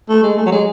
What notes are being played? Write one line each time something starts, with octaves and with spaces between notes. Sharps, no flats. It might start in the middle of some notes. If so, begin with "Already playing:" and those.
A3
G#3
A3
F#3
G#3